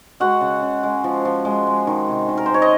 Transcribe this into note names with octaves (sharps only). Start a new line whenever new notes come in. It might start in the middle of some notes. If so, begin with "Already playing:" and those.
G#3 F#4 F#5
C#3
C#3
G#3
F3
F3
G#3
G#3
D#3
C3
D#3
A#4
G#3 C5
C#5
D#5